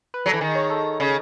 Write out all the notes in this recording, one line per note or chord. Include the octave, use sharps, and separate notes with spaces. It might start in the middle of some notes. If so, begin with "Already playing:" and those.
B4
F#3 A4
E3
D#3 G#4
C#5
A4
C#3